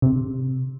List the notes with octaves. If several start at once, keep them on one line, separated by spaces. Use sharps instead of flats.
C3